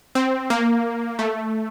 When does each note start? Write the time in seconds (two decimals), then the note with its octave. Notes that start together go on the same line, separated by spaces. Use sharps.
0.15 C4
0.50 A#3
1.19 A3